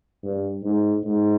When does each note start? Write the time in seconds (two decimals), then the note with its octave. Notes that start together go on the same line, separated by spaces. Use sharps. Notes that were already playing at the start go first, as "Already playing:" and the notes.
0.23 G2
0.63 G#2
1.04 G#2